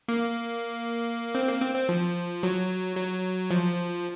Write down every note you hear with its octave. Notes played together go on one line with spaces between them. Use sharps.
A#3
C4
A#3
C4
C4
F3
F#3
F#3
F3